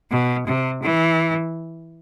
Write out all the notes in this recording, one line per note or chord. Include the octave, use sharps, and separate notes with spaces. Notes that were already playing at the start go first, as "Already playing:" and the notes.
B2
C3
E3